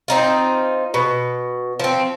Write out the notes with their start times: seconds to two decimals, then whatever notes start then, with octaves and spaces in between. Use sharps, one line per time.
0.08 C4 D#4 F4
0.94 B2
1.80 F3 C4